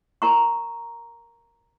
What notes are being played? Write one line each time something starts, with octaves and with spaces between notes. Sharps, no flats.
A#4 A#5 C#6